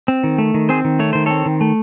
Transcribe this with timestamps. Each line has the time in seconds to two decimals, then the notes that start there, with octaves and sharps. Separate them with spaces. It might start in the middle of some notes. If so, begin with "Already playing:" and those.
0.08 C4
0.24 D#3
0.38 A3
0.54 D#3
0.69 C4 G#4 C5
0.85 D#3
0.99 A3 C#5
1.13 D#3 C5
1.26 C4 A4 C#5
1.46 D#3
1.61 A3